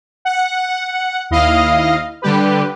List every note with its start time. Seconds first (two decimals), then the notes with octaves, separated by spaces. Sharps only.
0.25 F#5
1.30 D#2 E4 D#5 F5 F6
2.22 D3 G3 G4 B4